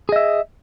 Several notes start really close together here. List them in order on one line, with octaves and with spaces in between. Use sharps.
G#4 D#5 E5